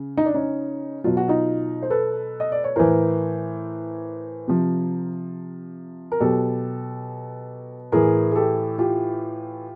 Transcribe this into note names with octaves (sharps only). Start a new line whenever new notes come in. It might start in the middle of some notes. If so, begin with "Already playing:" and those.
Already playing: C#3
D#4
D4
C#4 D#4
B2 F#3 F4
F#4
D#4 F4
C5
A4 B4
D#5
D5
C#5
A2 E3 A#4 C5
C3 F3
A#4
B2 F#3 G4 A4
A2 E3 G#4 A#4
G#4
G4 A4
F4 G4